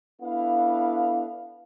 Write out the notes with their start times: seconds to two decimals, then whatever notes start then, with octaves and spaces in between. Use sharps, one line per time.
0.22 B3 D4 E4 A4 F5